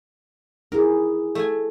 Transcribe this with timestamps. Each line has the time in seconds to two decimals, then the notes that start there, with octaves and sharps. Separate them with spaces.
0.72 D#4 E4 G#4 A#4
1.35 A3 G#5